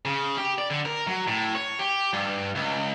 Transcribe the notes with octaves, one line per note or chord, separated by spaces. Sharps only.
C#3
G4
D5
D3
A#4
F#3
A2
C#5
G4
G2
C#2